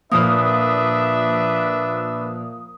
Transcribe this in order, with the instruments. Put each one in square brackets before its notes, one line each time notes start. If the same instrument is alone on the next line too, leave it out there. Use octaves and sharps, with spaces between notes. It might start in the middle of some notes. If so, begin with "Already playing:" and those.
[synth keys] A#2 F3 A#3 [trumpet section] D4 B4 E5 [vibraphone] D#6